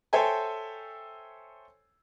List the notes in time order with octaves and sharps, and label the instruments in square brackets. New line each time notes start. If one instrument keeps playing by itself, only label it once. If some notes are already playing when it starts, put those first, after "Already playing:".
[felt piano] A4 C5 C#5 E5 G5 G#5